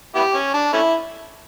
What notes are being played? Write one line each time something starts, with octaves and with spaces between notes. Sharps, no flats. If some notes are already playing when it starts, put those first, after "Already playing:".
B3 E4 G4
C#4
D4
A3 C#4 E4